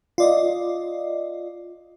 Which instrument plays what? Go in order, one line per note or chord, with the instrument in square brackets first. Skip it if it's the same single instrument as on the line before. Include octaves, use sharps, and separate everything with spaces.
[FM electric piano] F4 D5 D#5